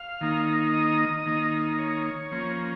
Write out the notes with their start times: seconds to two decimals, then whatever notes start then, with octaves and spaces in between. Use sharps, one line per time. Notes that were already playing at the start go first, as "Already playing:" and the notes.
Already playing: F5
0.21 D#3 A#3 D#4
0.74 D#5
1.26 D#3 A#3 D#4
1.78 C#5
2.31 F3 A#3 C#4